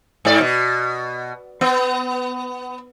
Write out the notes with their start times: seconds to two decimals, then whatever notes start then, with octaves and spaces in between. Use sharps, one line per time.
0.25 G#2 D5
0.41 B2
1.61 B3